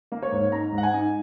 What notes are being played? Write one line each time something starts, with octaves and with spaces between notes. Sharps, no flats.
A#3
C#5
G#2
D#4 A#5
G#2
F#5
G#5
D#4